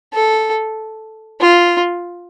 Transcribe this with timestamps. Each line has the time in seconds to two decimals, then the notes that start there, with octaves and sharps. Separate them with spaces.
0.14 A4
1.41 F4